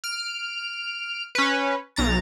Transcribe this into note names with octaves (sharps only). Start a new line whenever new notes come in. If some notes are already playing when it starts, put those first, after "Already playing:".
F6 D7
C#4 B4
B1 A#5 A6